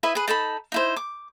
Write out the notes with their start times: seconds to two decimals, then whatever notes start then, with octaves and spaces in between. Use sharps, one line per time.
0.03 E4 B4 D#5 E5
0.15 G#4 B4
0.28 D#4 A4 A5 B5
0.72 D#4 E4 C5
0.96 D6